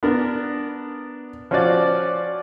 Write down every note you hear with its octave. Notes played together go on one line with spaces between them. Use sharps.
B3 D4 A#4
F3 C#4 F4 F#4 D5